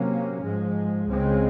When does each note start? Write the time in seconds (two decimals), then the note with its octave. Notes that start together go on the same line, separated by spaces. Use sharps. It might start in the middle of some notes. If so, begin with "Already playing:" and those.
Already playing: C3 F#3 A#3 C#4
0.41 G#2 F3 G#3
1.07 C#2 C#3 G#3 C4